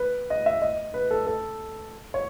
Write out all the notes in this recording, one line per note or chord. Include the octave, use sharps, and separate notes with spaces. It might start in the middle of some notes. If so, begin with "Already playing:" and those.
Already playing: B4
D#5
E5
D#5
B4
A4
A4
C#5